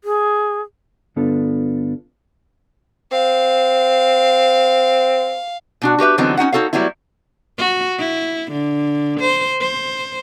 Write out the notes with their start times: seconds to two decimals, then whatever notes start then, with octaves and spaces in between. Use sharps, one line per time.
0.04 G#4
1.16 G2 D3 B3 D4 F4 A4
3.12 C4 F5
5.82 B2 D4 F#4
5.99 F#4 G4 B4 E5
6.18 D3 E3 F#3 B3 C4 D#4
6.37 C#4 D#4 F#4 F#5
6.53 D#4 F#4 A4 C#5 F5
6.73 F#3 G3 A3 B3 E4
7.58 F#4
7.98 E4
8.51 D3
9.20 C5
9.61 C5